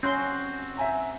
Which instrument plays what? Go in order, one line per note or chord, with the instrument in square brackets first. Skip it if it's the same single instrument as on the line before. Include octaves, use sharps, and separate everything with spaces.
[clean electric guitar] C4 F#4 [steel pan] C#4 C6
[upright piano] E5 G#5 A#5